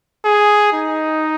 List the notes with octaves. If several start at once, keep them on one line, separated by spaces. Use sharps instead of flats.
G#4
D#4